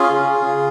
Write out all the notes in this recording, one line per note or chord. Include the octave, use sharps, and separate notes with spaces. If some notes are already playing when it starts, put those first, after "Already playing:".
Already playing: C#4 F4 G#4
C#3
C#3
C#3